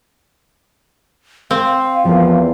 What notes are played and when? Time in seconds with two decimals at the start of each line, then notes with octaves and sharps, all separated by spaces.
1.51 C4 F5
2.05 E2 F3 A#3